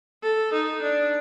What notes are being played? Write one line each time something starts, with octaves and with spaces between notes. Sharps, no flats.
A4
D#4
D4